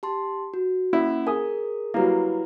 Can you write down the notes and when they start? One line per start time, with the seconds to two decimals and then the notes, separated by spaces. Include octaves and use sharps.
0.03 G4 A5 C6
0.54 F#4
0.93 A#3 C#4 E4 F#5
1.27 G#4 A#4 G#5 D#6
1.94 F#3 G3 A#3 E4 B4